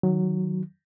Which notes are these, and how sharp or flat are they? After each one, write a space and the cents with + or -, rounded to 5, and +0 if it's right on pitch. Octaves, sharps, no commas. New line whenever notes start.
D#3 +0 F#3 +0